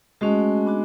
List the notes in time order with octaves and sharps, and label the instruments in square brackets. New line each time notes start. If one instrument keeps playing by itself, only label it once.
[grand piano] G#3 [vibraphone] A3 C#4 F#4
[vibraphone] B3 D4 F#4